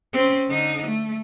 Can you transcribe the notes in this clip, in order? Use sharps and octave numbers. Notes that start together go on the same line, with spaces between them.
C4 C#4
D3 D#4
A3